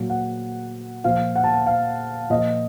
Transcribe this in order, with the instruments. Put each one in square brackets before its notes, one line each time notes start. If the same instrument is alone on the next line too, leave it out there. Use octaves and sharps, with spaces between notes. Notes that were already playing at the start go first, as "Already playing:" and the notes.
Already playing: [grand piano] A#2 F#3
F#5
A#2 F3 F5
F#5
A5
F#5
F5
A#2 F3 D#5